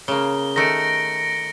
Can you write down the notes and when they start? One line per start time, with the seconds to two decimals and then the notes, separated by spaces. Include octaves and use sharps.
0.08 C#3 A#3 G7
0.56 D#3 A3 A#6 C#7 D7